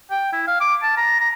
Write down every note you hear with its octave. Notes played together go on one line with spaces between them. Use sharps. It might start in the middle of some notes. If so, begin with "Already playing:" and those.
G5
E4
F5
D6
A5
A#5
A#5